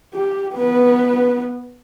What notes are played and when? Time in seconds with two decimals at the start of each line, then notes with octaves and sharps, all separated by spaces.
0.14 G4
0.55 B3 B4